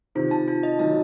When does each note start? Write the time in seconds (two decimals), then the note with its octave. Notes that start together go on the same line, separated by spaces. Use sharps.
0.15 C3 D#3 F4
0.31 A5
0.48 F4
0.63 D#5
0.79 D#3 F#3 A5